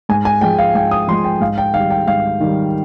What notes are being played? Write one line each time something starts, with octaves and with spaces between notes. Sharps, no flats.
G#2 G#5
G#5
F3 G#3 G5
F5
G#2 G5
D#6
F3 G#3 C6
G5
G#2 F5
G5
D#3 G3 F5
G5
G#2 F5
D#3 G3